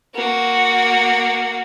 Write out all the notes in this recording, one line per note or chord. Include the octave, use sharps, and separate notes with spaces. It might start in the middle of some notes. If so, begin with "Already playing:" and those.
A#3 F#4